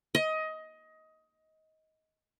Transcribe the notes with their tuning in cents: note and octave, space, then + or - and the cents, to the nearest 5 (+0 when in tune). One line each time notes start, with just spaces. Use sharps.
D#5 +20